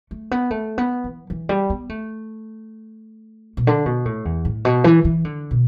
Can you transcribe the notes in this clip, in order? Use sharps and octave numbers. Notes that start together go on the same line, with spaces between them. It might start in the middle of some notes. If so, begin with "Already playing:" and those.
A3
B3
A3
B3
E3
E3
G3
B3
A3
B2
D3
B2
A2
E2
A2
B2
E3
E3
D3
B2